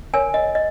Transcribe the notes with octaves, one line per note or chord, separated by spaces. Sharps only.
A#4 C#5 G#5
D#5
D#5